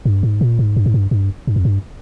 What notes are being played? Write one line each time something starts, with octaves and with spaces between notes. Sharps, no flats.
G2
G#2
A#2
G#2
G2
G#2
G2
G2
G2
F2
G2